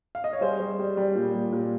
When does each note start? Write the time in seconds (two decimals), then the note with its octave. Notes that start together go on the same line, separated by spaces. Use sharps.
0.15 F5
0.24 D#5
0.33 C#5
0.41 G3 G#4 C5
0.60 G3
0.79 G3
0.97 G3
1.15 A#2
1.34 G3
1.52 A#2